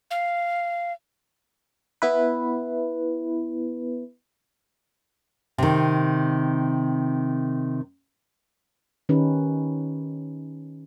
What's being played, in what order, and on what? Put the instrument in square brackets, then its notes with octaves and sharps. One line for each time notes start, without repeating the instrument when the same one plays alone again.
[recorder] F5
[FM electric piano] B3 E4 B4
[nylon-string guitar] C3 D#3
[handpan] D#3 C#4 D#4 G4 B4